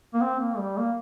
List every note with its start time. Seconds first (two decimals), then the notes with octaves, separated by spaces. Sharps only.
0.14 A#3
0.21 C4
0.39 A#3
0.58 G3
0.77 A#3